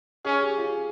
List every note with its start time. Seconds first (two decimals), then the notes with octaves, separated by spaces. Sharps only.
0.25 C#4 G#4
0.41 G4
0.58 F4